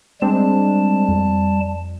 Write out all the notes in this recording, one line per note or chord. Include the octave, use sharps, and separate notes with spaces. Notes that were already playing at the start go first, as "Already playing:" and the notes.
G3 G#3 C4 D4 A5
F2